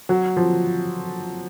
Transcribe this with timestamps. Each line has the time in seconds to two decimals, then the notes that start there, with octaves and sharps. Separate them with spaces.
0.09 F#3
0.37 F3